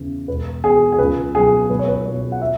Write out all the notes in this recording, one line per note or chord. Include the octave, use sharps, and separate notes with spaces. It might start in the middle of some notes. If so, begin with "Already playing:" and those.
Already playing: E2 C#3 E3
E1 B4
E2 B2 G#4
G#4
C#2 B4
B2 F#3 G#4
B1 B4
C#5
B4
B2 F#3 C#5
F#5
E5